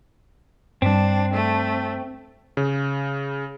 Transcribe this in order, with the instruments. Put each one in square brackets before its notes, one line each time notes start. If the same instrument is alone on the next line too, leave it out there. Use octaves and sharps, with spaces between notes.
[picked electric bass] G2 G3 [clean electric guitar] C4 [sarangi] D4
[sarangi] A3
[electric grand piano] C#3